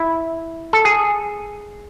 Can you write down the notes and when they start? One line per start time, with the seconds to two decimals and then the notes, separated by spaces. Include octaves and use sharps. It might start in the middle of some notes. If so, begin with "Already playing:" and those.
Already playing: E4
0.73 A4
0.85 G#4